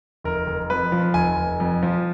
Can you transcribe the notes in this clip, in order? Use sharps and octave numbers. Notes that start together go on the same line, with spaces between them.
F1 A#4
F1
F2 B4
F3
F1 G#5
F1
F2
F3